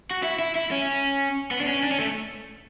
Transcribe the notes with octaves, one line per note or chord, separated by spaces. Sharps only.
F#4
E4
E4
E4
C#4
B3
D4
C#4
D4
C#4
A3